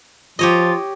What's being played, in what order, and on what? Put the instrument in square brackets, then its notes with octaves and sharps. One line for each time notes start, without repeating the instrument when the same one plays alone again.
[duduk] F3 [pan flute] F4 [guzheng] G4 C#5 D#5